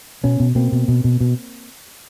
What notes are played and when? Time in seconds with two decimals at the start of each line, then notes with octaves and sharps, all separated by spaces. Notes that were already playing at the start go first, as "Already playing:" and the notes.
0.24 B2 B3 C#4
0.40 B2
0.55 B2 A#3 C4
0.72 B2
0.88 B2
1.04 B2
1.21 B2